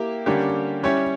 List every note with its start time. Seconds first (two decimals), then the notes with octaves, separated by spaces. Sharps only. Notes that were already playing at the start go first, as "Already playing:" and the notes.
Already playing: A#3 E4 G4
0.26 D3 G3 A#3 C#4 G4
0.83 G3 C#4 E4 G4 C#5